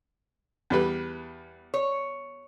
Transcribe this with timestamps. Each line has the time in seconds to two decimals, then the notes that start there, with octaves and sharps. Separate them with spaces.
0.70 E2 G3 B4
1.74 C#5